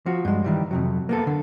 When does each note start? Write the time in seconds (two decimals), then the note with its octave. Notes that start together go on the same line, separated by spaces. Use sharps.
0.06 F3 F#4
0.25 G2 G#3
0.44 D#3 E3 G3
0.71 F2 C3 F#3
1.09 A#3 B3 A4
1.27 D3